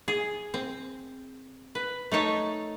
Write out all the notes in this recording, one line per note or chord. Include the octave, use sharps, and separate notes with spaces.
G#4
C4
B4
A3 D#4 C#5 A5